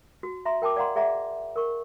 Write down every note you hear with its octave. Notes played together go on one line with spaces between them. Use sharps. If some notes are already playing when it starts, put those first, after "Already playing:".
F#4
E5 A#5 C6
A#4 G5 A5 D6
D5 F5 F#5 A#5 C6
G#4 D5 E5 F#5 A#5
A#4 C#6